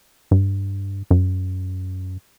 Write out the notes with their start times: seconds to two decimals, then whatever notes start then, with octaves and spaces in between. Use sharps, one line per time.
0.31 G2
1.11 F#2